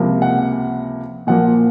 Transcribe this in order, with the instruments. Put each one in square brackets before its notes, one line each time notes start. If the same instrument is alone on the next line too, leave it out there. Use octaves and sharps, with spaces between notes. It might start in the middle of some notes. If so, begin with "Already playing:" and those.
Already playing: [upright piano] C#2 C3 F3 A#3
F#5
A#2 F3 A#3 F#5